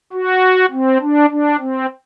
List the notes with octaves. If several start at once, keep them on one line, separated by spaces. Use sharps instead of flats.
F#4
C4
D4
D4
C4